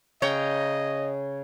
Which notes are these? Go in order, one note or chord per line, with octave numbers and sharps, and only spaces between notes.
C#3 C#5 D#5 G5 A#5